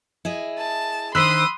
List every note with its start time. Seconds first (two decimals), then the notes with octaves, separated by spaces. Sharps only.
0.25 E4 G#4 D#5
0.58 A5
1.15 D#3 D4 C5 B5 C6 D#6 E6 F#6